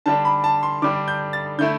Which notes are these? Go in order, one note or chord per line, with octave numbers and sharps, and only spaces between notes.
D3 G3 D4 A5
B5
A5
C6
D3 G3 D4 D6
G6
A6
D3 A3 E4 G6